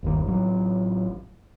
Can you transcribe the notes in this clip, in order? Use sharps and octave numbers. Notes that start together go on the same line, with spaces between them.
G1 D#2 D#3
A1 F#3